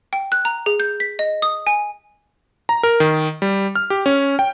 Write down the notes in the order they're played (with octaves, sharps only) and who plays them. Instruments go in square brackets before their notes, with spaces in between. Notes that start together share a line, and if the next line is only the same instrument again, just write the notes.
[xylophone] G5
F#6
A#5
G#4
G6
B6
D#5
D#6
G#5
[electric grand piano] A#5
A#4
D#3
G3
F6
G4
C#4
G5